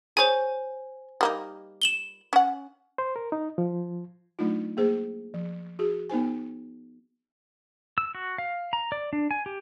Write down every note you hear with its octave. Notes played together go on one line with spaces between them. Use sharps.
G#4 C5 C#5 G#5
G3 A#3 D#4
E7 F#7 G7
C#4 F#5
C5
A#4
D#4
F3
F#3 A3 D4 D#4 F4
A#3 G#4 C5
F3
F#4 G#4
B3 D#4 C5 G#5
E6
F#4
F5
A#5
D5
D4
G#5
G4